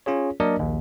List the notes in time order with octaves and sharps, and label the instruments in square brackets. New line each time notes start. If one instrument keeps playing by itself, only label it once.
[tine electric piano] C#4 F4 G#4 C#5
F#3 A#3 D4 A#4 D5 D#5
A#1 D#2